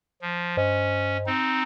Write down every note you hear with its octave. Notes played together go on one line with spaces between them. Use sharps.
F3
G2 C#4 C5 D#5
C4 D#4